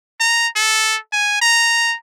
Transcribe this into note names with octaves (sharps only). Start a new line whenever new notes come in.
A#5
A4
G#5
A#5